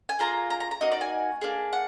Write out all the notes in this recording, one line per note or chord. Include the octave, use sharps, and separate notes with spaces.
G#5
A#3 F4 G#4 A#5
A#5
A#5
A#5
A#3 D#4 F#4 D#5
D5
G#5
A#3 D4 G#4
F#5